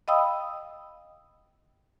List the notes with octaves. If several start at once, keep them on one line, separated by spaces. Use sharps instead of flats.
D#5 F5 G5 B5 D#6 E6